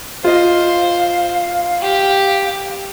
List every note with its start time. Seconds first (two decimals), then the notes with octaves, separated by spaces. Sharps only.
0.24 F4 C5 D#5 F5
1.81 G4